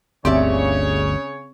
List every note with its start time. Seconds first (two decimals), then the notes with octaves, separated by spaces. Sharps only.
0.25 G1 D2 C#3 C4 G4 C#5 D5 E5